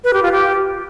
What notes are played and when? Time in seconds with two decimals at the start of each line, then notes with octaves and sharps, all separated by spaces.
0.04 B4
0.13 G4
0.23 F4
0.32 G4